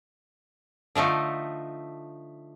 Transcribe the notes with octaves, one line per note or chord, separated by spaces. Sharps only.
D3 F3 A3 D#4